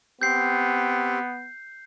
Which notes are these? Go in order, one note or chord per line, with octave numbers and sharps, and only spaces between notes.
B3 C4 G4 G6 C7